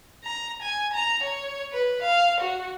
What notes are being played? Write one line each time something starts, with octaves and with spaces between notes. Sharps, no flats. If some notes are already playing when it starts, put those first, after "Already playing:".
A#5
G#5
A#5
C#5
B4
F5
F#4